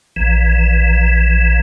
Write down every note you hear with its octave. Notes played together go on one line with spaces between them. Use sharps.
A#1 E3